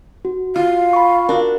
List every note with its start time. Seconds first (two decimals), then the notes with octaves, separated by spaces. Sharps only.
0.25 F#4
0.56 F4 F5
0.93 B5 C#6
1.29 D4 F#4 A#4